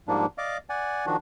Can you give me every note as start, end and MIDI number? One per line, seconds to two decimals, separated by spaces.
0.08 0.26 44
0.08 0.26 53
0.08 0.26 55
0.08 0.26 58
0.08 0.26 62
0.38 0.58 74
0.38 0.58 75
0.38 0.58 77
0.38 0.58 86
0.70 1.06 74
0.70 1.06 78
0.70 1.06 80
1.06 1.16 51
1.06 1.16 53
1.06 1.16 62
1.06 1.16 66